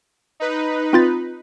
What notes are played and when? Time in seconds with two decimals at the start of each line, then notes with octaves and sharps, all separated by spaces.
0.40 D#4 B4
0.93 C4 F4 A6